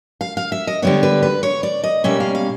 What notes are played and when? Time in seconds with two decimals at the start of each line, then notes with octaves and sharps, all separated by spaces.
0.21 F5
0.37 F5
0.52 E5
0.67 D#5
0.82 D3 G3 B3 C#5
1.03 B4
1.23 B4
1.43 C#5
1.63 D5
1.83 D#5
2.04 B2 G3 A#3 C#4 E5
2.20 F5
2.35 F5